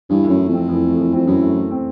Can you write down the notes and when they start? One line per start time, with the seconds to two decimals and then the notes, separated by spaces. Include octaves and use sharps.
0.09 G2 E3
0.24 F#2 A3
0.38 E3
0.48 F2
0.53 C4
0.69 E3
0.83 A3
0.97 E3
1.13 F2 C4
1.27 F#2 E3
1.41 A3
1.55 E3
1.71 C4